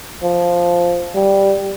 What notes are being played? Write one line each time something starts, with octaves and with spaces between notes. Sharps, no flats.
F3
G3